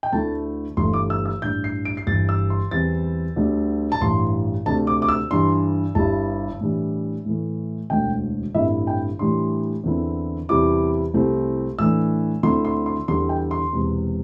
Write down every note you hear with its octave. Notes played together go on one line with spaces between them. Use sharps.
G5
D2 D3 A3 E4 A5
G1 G2 E3 A3 C6
D6
E6
E6
A1 G2 G3 D4 G6
C7
D7
C7
G1 G2 E3 A6
E6
C6
E2 E3 G3 C4 A6
D2 D3 G3 D4
A5
A1 G2 E3 C6
D2 C3 A3 D4 A5
D6
D6
E6
G2 E3 G3 D4 C6
G1 G2 G3 E4 A5
A2 E3 G3 D4
A2 E3 A3
E1 D2 D3 A3 G5
A1 G2 D3 C4 E4 E5
G5
A2 E3 G3 D4 C6
E2 D3 C4 E4
E2 C3 G3 E4 D6
C2 C3 A3 C4 E4
A2 E3 A3 D4 E6
D2 D3 A3 C4 E4 C6
C6
C6
E2 D3 G3 C6
G5
C6
E1 E2 C3